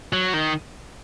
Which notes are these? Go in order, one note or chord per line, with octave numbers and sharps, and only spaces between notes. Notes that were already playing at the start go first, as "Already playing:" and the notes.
F#3
D#3